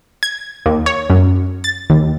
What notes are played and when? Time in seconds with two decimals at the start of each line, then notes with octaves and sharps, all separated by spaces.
0.23 G#6
0.66 D#2
0.86 C#5
1.10 F#2
1.64 A6
1.90 D#2